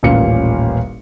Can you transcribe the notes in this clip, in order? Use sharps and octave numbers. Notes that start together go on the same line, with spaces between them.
D#1 A1 A#2 C#4 F5 C#7